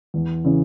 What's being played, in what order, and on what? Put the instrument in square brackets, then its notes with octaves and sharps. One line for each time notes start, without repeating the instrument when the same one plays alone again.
[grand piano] E2
C#3 E3